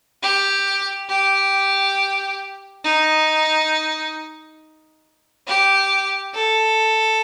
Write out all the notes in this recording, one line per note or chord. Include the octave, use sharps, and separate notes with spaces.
G4
G4
D#4
G4
A4